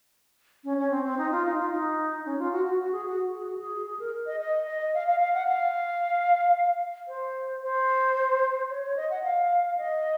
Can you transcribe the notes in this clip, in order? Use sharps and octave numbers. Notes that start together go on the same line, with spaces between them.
C#4
C#4
C4
C4
D#4
F4
D#4
F4
D#4
C#4
F4
F#4
F#4
F#4
G#4
F#4
G#4
F#4
G#4
G#4
A#4
D#5
D#5
D#5
F5
F5
F5
F#5
F5
C5
C5
C#5
C#5
D#5
F#5
F5
D#5